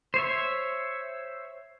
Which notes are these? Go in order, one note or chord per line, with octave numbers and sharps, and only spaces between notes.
C5 C#5 E5